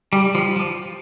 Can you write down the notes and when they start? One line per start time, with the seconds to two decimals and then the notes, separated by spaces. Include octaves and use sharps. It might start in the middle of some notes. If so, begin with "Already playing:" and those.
0.13 G3
0.35 F3
0.56 F3